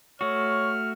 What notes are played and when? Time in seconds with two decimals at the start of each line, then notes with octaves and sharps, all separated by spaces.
0.21 A3 F#4 C#5 F6